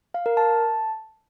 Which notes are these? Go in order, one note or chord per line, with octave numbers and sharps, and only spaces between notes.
F5
A#4
A5